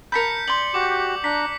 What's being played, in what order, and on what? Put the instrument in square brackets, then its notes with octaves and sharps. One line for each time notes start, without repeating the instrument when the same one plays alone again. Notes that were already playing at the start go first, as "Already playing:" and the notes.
[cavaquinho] A#4 A5 B5 [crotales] G6 B6 C#7
[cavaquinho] D5 C6 [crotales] F#7
[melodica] F#4 G4 [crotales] D6
[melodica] D4 A#5 [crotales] B6